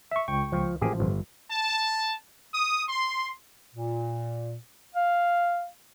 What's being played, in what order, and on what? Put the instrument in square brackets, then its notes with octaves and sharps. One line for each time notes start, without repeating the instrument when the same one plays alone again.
[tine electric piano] E5 C#6
C#2 G5 C#6
[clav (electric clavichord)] F3
[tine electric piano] A1 F3 [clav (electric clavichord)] A#3 G4 G#4
[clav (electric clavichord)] G1
[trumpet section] A5
D#6
C6
[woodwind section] A#2
F5